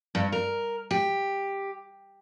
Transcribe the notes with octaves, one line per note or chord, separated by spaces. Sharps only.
G2
A#4
G4